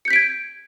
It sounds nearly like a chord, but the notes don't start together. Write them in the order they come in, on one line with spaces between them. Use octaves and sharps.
C#7 G6 B6 D7 G#6